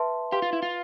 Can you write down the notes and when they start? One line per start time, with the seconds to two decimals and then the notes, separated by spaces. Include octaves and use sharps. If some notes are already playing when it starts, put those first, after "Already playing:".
Already playing: B4 E5 A5 C6
0.32 G4 B4 F5 C6
0.42 F4
0.53 E4
0.63 F4